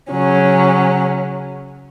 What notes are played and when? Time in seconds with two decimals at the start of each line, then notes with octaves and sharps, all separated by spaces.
0.11 C#3 F#3 C#4